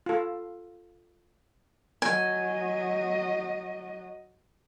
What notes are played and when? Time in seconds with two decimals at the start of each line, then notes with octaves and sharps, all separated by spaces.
0.06 F4 A4
2.02 F#3 D#5 G#5